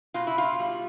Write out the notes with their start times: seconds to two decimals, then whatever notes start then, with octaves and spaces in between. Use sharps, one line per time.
0.14 B2 F4
0.27 E4
0.38 F4
0.60 G3